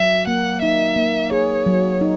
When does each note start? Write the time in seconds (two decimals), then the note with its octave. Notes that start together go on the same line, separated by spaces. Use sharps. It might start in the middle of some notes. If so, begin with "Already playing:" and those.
Already playing: F#3 E5
0.27 A#3 F#5
0.62 D#4 E5
0.96 A#3
1.32 G#4 C#5
1.66 F#3
2.01 D#4